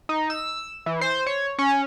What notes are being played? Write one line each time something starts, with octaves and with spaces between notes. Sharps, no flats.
D#4
E6
E3
C5
C#5
C#4